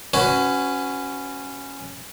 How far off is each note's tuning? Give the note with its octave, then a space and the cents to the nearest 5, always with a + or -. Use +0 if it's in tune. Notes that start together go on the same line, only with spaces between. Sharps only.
C#4 -5 F#4 +0 B4 +25